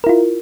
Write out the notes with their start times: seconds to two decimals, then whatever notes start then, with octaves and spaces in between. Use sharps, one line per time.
0.04 A#4
0.07 E4
0.09 F4